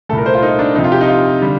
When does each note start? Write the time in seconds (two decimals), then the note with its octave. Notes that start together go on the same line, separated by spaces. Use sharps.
0.09 C2 A#2 A3 A4
0.18 A#4
0.26 C5
0.34 F4
0.42 D#4
0.59 D4
0.75 F2 C3 F3 D#4
0.84 F4
0.92 G4
1.01 D#4
1.09 F4
1.41 D3 G3